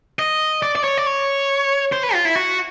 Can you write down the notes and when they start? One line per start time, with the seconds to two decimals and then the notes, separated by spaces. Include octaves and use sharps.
0.19 D#5
0.62 D5
0.75 D5
0.84 C#5
0.98 D5
1.06 C#5
1.92 C5
2.03 B4
2.14 F4
2.25 E4
2.36 F#4